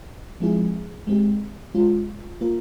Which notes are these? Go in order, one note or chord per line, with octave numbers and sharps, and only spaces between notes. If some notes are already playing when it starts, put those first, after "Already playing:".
F3 G#3 C4 E4 G#4
G#3 C4 G4
G#3 C#4 F4
A#3 F4 A#4